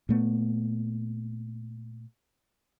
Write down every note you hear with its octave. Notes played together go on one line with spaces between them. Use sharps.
A#2 A3 B3